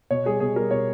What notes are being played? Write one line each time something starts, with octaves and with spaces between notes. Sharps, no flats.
B2 C#5
G3 G#4
B2 G#4
G3 A#4
B2 C#5